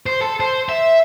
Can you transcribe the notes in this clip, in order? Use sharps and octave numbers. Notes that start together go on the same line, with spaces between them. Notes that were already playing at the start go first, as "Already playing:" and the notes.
C5
A4
C5
E5